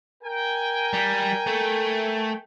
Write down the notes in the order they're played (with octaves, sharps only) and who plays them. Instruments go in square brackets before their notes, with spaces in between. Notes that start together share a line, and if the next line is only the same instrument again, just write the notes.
[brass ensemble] A#4 G5 G#5
[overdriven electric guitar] G3
A3